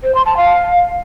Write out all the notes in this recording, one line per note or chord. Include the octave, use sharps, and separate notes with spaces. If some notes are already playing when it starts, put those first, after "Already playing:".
C5
C6
A5
F5